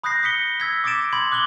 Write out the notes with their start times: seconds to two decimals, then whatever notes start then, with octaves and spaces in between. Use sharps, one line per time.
0.04 B5 D#6 F#6 G6 A#6 C7
0.23 D#6 B6 C#7 G7
0.60 E6 G#6 B6
0.84 D6 D#6 G#6 A6 D7 E7
1.13 B5 C6 G#6 F#7
1.32 D6 F#6 G#6 F#7 G7